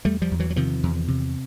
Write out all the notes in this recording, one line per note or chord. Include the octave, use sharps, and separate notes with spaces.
E2 G3 A3
F3 G3
E2
E3 F#3
F#3
C3 D#3 F3
E2
C3